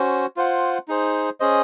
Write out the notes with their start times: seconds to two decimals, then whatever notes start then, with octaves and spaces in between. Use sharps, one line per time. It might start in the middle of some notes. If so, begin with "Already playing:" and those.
Already playing: C#4 F#4 C5
0.36 F4 C5 F#5
0.88 D#4 G#4 C5
1.40 C#4 G#4 C5 D#5